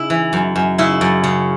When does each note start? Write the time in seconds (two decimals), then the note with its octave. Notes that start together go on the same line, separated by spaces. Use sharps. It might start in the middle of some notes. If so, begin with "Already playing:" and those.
Already playing: C#3 E4
0.10 E3
0.33 F#2
0.56 F#2
0.78 C#3 E4
1.01 F#2
1.24 C#3